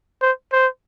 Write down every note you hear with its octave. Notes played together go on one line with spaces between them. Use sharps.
C5
C5